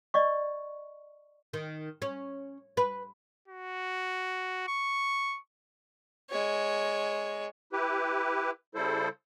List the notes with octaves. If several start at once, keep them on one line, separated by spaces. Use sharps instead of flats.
D5 D#5 C#6
D#3
C#4
B4
F#4
C#6
G#3 C#5
E4 G4 B4
C#3 G3 E4 A4 C5